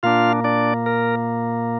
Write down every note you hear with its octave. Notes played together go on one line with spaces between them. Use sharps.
A#2 A#3 D4 F4 F5
D4 D5
A#4